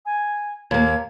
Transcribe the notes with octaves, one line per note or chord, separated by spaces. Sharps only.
G#5
D#2 A#3 G#6